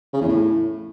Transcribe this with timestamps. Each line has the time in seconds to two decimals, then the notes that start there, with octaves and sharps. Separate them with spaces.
0.13 C#3
0.21 E2
0.29 A2